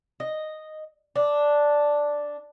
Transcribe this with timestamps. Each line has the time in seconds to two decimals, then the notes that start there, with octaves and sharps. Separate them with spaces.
0.20 D#5
1.15 D4